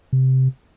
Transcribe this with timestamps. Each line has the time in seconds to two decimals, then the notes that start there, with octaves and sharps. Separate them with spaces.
0.13 C3